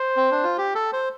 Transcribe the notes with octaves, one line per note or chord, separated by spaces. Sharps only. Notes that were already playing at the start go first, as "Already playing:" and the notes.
Already playing: C5
C4
D4
F4
G4
A4
C5